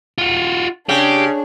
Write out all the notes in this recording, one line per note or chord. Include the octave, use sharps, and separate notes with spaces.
F4 F#4
C#3 D4 G4 G#4